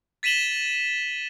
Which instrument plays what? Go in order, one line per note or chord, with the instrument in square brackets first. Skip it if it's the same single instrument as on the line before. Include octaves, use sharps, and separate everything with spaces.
[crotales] A6 B6 D#7 E7 F#7 G7